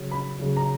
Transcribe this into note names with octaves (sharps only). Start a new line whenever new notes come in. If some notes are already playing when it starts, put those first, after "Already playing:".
Already playing: C#3 F#3
B5
C#3 F#3
A#5